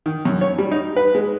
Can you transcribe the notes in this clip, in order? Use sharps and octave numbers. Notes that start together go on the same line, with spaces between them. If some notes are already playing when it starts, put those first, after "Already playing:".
D#3
F#2
C#5
G3
D#4
B4
G#3